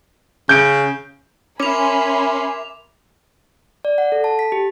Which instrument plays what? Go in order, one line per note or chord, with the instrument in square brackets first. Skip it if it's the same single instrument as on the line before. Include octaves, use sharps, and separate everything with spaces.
[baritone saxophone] C#3 [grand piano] G6 D7
[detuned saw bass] C#4 [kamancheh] A#4 E5 [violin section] G#5 B5 C6 [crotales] D6 F7
[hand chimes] D5
F#5
A4
A5
B6
G4